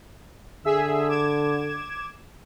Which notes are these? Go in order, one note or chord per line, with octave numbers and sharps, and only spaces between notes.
D3 G#4 E5 E6
D6 G#6 E7